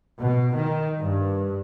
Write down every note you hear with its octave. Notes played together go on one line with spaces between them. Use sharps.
B2
D#3
G2